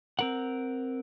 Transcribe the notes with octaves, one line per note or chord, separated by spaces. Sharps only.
C4 A#4 F#5